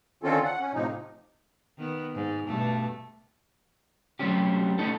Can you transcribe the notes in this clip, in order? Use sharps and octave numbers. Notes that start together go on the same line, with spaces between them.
D3 D#3 C4 C#4 F4 A4
F#5
C#4
A2 C3 F3 D#4
D#3 B3
G#2
G2 B2 A3
F#3 G3 A3 C4 C#4 G4
A3 B3 C#4 D#4 A4